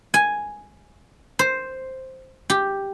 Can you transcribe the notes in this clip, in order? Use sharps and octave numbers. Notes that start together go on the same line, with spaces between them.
G#5
C5
G4